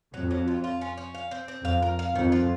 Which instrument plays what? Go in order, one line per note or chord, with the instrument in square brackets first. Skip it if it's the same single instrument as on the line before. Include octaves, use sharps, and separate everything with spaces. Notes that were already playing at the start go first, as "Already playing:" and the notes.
[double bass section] F2 [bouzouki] F#3
[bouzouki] F#3
F4
F4
C#4
C#4
F5
C4
C4
[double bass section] F2 [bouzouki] F5
[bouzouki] A#4
F5
[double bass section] F2 [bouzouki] D#3
[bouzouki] F4